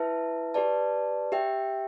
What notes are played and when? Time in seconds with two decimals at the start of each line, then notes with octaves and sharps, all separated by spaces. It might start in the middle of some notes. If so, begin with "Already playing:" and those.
Already playing: E4 B4 E5 A5
0.54 G4 B4 D5 A5
1.32 G4 E5 G5